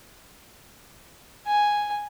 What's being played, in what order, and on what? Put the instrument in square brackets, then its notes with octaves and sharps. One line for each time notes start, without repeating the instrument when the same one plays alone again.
[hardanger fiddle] G#5